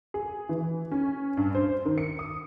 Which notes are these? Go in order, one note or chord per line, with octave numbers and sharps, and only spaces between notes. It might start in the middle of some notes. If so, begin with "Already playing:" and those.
G#4
E3
C#4
G2
C5
D#3
C#7
D#6